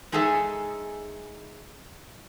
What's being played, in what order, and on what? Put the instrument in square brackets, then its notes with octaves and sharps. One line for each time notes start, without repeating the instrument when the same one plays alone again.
[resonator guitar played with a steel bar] G#3 D#4 G#4 A4 E5 G#5